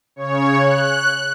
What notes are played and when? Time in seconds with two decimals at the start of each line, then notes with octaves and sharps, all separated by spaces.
0.16 C#3 C#5
0.60 F#6